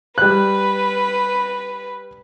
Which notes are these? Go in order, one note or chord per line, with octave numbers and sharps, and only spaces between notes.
G3 B4 F#6